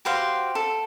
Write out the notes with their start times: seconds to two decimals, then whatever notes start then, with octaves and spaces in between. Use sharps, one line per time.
0.05 F#4 G4 C5 F5
0.55 A4